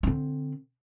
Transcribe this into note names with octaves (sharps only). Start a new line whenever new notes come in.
D3 C4